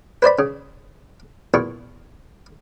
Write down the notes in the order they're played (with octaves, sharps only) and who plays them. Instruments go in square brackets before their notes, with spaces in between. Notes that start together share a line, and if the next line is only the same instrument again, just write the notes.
[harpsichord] B4 C5 D5 B5
C#3
E2 A#2 C#6